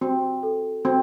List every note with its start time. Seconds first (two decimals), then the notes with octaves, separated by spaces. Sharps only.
0.01 C4 F#4
0.43 A4
0.85 C4 F#4